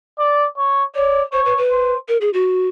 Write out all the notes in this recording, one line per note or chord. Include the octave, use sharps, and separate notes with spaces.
D5
C#5
C#5 D5
C5 C#5
B4
B4
C5
A#4
G#4
F#4